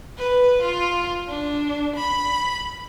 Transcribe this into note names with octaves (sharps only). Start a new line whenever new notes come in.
B4
F4
D4
B5